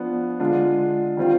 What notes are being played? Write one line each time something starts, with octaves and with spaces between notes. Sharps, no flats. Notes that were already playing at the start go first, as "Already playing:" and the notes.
Already playing: F3 B3 D4 F4
D3 G#3 D4 F4
D#3 G3 C4 F4